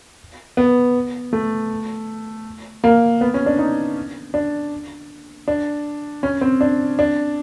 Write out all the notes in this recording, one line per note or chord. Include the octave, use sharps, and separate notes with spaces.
B3
A3
A#3
B3
C#4
D4
D#4
D4
D4
C#4
C4
D4
D4